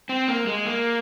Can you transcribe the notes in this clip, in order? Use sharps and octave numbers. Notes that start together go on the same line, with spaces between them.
C4
A#3
G#3
A#3